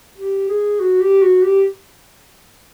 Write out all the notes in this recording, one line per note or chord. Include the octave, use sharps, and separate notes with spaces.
G4
G#4
F#4
G4
F#4
G4